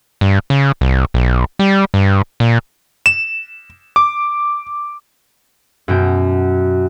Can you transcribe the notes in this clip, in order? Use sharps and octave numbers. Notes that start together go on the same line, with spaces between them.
G2
C#3
C2
B1
G3
G2
A#2
E7
D6
F#2 B2 G5